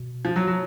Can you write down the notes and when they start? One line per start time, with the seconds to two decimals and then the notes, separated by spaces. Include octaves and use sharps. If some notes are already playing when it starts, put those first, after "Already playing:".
Already playing: B2
0.25 F3
0.36 F#3
0.47 F#3